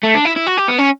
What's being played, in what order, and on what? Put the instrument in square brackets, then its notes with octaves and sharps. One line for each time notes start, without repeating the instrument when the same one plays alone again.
[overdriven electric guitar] A3
D4
E4
E4
F#4
G4
B3
C#4